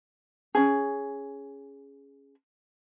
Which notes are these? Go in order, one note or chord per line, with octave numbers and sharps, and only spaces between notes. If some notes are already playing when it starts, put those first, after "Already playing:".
C#4 G#4